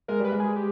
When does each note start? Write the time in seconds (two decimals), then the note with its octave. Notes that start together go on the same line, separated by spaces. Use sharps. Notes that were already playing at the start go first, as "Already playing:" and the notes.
0.08 G#3 A#4
0.20 G3 B4
0.32 G#3
0.40 G#4
0.56 G4